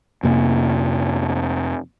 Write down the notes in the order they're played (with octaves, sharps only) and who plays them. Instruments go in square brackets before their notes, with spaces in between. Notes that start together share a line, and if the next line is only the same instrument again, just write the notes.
[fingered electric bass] F2 C3 A#3